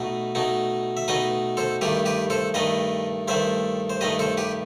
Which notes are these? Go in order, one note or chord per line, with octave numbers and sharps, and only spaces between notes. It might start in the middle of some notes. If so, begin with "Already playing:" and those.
Already playing: B2 A3 D#4 B4
B2 A3 D#4
E5
B2 A3 D#4 B4 D#5
A4 C5
G2 D#3 A3 G4 B4
G4 B4
A4 C5
G2 D#3 A3 B4 D#5
G2 D#3 A3 C5 E5
C5
G2 D#3 A3 B4 D#5
A4 C5
G4 B4